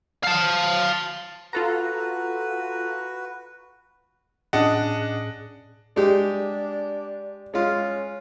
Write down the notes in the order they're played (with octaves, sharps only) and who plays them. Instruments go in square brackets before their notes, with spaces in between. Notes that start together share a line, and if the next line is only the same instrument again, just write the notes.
[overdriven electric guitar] F5 A5
[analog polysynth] F4 A4 A#5 [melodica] F#4 B4
[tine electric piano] A2 C#4 G#4 [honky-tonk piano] D4 D#5 F#5
[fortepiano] G#3 G4 [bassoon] D4
[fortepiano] G#3 F4 [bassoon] C#4